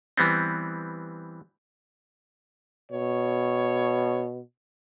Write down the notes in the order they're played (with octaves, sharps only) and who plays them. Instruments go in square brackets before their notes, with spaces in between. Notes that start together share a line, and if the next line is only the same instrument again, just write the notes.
[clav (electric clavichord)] E3 G3 B3 C4
[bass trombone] B2 [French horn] C#5